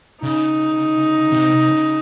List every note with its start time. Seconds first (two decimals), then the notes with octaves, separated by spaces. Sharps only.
0.22 C#3 D#4
1.32 C3
1.50 C3
1.69 C#3